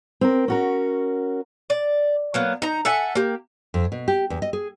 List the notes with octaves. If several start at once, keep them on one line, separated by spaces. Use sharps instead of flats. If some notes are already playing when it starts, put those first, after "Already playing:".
C4 A#4
C#4 F#4 A#4
D5
F#3 A#3 B3
D#4 A#5
A4 E5 F#5 G#5
A#3 G4
F2
B2
G4
E2
D#5
G#4